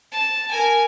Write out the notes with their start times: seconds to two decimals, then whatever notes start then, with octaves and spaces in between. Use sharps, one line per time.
0.12 A5
0.50 A#4 G#5